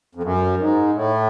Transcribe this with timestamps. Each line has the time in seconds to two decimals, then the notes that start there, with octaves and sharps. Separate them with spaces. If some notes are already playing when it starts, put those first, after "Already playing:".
0.15 F2
0.23 F#2
0.59 G#2
0.94 A2